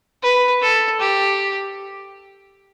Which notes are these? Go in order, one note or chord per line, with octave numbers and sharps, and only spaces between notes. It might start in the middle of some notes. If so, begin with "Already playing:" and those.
B4
A4
G4